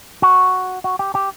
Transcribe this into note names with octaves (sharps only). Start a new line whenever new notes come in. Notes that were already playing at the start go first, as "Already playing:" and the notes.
F#4
F#4
G4
G4